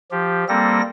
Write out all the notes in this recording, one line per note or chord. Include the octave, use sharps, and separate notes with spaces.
F3 G4
G3 A#3 C4 A4 A#6